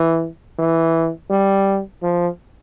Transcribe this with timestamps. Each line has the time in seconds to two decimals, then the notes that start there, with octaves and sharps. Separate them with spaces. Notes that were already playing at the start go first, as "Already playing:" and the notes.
Already playing: E3
0.59 E3
1.30 G3
2.03 F3